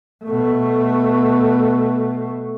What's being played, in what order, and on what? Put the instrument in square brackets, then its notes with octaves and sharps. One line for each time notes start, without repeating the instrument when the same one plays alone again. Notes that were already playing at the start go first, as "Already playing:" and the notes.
[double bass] B2 A3